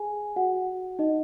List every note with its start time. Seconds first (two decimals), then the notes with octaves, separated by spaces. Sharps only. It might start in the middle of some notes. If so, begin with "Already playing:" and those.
Already playing: G#4 G#5
0.36 F#4 F#5
0.99 D#4 D#5